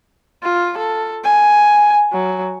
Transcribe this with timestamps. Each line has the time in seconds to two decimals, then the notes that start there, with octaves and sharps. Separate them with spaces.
0.43 F4
0.77 A4
1.24 G#5
2.12 F#3